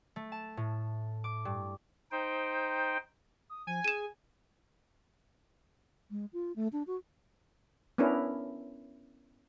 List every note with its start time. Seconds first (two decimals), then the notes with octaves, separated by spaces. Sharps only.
0.16 A3
0.32 A5
0.57 A2
1.24 D6
1.45 G2
2.12 D#4 C5 G5
3.50 D#6
3.67 F3 G#5
3.84 G#4 D#7 E7
6.11 G#3
6.33 F4
6.56 A3
6.73 D4
6.87 F#4
7.98 B3 C#4 D4 E4 A#4